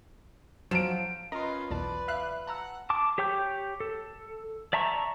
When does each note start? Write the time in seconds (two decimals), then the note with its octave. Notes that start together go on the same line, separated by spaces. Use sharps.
0.71 F3 F#3 D7 E7
1.32 C#4 F4 A#4 B4 D#5 A#5 C6
1.71 B1 E2 B4 D5 A5
2.08 E5 F5 F#6
2.47 F#5 A5 A#5 E6
2.90 A5 D6
3.18 G4 C#5 G5 D6 G6
3.80 A4
4.73 D5 E5 A5 A#5 C#6